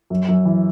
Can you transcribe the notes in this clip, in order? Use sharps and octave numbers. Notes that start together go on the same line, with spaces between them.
F#2
F#2
E3